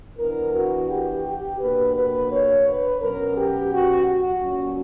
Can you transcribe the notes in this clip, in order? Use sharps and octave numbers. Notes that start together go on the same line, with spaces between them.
E3 B3 D4 A#4
F#4
G4
G4
B2 A#3 D4 B4
B4
C#5
B4
B2 F#3 C#4 A#4
G4
F#4
F#4
A#2 F#3 C#4